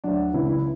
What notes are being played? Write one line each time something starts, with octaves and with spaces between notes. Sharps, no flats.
D2 D3 F#3 D4
C#2 C#3 E3 E4
E4